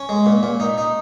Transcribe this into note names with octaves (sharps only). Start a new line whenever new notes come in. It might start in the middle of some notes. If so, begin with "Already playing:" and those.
Already playing: C#4 C#5
G#3
A#2
A#2
D#4
D#4